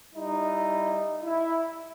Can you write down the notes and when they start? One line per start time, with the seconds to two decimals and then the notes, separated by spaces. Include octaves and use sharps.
0.14 G3 D#4 E4
1.24 E4